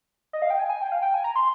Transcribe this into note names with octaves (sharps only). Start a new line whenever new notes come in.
D#5
F5
G5
G#5
G#5
G5
F5
G5
G#5
A#5
C6